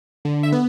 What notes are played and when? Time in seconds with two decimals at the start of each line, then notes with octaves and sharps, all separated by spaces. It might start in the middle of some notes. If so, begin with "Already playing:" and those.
0.25 D3
0.43 E5
0.52 B3